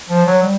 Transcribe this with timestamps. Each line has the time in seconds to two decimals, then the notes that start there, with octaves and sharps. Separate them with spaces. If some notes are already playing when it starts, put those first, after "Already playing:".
0.09 F3
0.26 F#3
0.43 G3